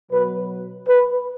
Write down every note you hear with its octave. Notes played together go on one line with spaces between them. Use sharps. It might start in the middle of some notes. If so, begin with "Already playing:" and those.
B2 F#3 B4
B4